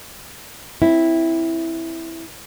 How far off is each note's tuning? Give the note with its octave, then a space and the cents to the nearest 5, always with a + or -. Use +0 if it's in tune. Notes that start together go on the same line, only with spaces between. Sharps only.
C4 +0 E4 -5